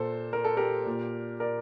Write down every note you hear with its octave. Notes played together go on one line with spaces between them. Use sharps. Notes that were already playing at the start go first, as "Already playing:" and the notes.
Already playing: A#2 A4 C5
A#4
A4
G4 A#4
A#2
A#4 D5